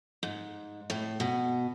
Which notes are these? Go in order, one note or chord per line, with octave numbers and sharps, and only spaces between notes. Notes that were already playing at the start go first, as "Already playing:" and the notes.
G#2
A2
B2